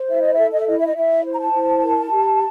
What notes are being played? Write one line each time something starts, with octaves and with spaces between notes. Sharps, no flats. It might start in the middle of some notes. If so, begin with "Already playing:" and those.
Already playing: C5
E4 E5
D#5
A4 E5
D#5
E5
E4 D#5
E5
D#5
E4 E5
C5
A#5
A5
E4
A#4
G4